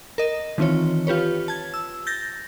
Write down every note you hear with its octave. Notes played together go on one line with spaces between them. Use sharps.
A#4 D#5
D#3 E3 C4 F4 C#5
F4 G4 B4 C#5
A5 G#6
E6
G6 A6 A#6